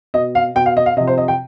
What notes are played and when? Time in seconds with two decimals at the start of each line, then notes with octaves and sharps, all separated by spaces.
0.14 B2 D#5
0.35 F5
0.55 B2 G5
0.66 F5
0.77 D#5
0.86 F5
0.97 C3 D#5
1.01 F3
1.07 C5
1.18 D#5
1.28 G5